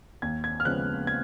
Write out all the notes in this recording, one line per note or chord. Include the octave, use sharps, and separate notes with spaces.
D#2 G#6
G#6
F6
C#3 F3 G#3 B3 F#6
G#6